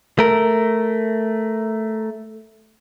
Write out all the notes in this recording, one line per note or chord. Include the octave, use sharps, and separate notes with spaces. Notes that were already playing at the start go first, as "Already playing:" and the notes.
A3 A#4